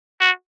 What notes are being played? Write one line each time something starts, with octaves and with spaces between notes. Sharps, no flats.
F#4